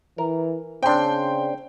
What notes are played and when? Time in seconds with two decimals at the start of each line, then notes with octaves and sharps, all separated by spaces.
0.18 E3 A#4
0.83 C#3 C4 D4 G5 C6